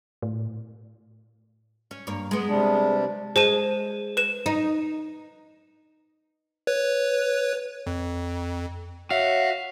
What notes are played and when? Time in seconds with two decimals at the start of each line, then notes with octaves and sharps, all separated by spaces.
0.22 A2
1.91 C#4
2.07 G2 A#3 C#5
2.31 G#3 B3
2.48 C3 G3 D4
3.36 G#3 C5 A5 D#7
4.17 B4 E7
4.46 D#4
6.67 B4 C#5
7.87 F2
9.11 F#4 C#5 E5 F5